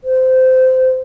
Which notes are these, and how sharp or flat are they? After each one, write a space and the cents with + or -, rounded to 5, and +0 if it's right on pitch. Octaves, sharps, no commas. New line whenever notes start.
C5 -20